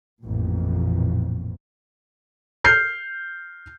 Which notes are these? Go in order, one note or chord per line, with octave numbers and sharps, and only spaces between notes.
A1 F2 A#2
F6 G6 C7